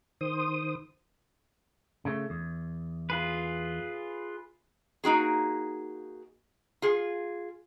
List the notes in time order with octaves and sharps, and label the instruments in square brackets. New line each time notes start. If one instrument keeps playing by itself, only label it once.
[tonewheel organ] D#3 C5 D#6
[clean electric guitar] C#3 A3
E2
[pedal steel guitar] F4 G#4 B4
[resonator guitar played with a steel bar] A#3 D#4 F#4 G#4
F4 G#4